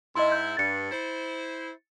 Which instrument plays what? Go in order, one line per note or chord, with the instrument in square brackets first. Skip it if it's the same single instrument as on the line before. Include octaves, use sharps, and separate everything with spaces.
[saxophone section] G#2 E4 [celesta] D#5 C6
[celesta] G6
[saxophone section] G2 [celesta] A6 C#7
[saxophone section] E4 C5